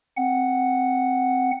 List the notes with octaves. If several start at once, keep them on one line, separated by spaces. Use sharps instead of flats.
C4 F#5